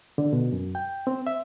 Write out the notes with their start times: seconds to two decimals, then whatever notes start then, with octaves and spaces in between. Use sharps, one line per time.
0.18 D3
0.33 B2
0.53 F#2
0.75 G5
1.07 C4
1.27 E5